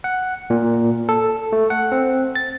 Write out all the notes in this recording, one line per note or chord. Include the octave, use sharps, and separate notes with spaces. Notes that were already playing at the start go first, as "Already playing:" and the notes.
F#5
A#2
A4
A3
F#5
C4
A6